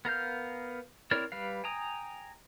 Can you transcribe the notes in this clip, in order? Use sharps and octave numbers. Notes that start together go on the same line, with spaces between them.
B3 A#4 F5 G6
C4 E4 A#4 C#5 D5
G3 B4 F5
G5 G#5 A#5 D#6